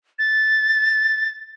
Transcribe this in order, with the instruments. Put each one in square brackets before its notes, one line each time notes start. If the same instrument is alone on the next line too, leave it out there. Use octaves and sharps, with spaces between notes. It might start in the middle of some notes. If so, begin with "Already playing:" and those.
[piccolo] A6